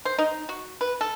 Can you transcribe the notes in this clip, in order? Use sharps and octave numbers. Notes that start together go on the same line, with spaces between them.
C5
D#4
F#4
B4
A4